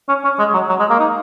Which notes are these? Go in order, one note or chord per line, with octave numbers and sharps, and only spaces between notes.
C#4
C#4
G#3
F#3
F#3
G#3
A#3
D#4